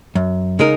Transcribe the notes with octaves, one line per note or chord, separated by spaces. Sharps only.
F#2
C#3 G#3 D#4 A#4